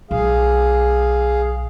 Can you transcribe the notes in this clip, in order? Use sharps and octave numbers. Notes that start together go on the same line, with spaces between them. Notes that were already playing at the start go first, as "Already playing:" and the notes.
B1 G#4 F5